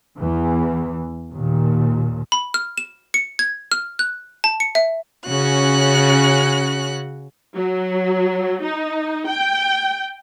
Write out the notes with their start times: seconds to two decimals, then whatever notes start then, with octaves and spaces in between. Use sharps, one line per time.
0.17 E2 E3
1.31 D#2 A#2
2.32 B5
2.54 F6
2.78 E7
3.14 C#7
3.39 G#6
3.72 F6
3.99 F#6
4.44 A5
4.60 C#7
4.75 E5
5.26 C#3 C#4 F#4 F#6
7.55 F#3
8.63 D#4
9.28 G5